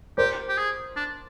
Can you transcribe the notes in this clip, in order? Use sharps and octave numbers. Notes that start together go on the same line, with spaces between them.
G4 A#4 C5
G4
G#4
D4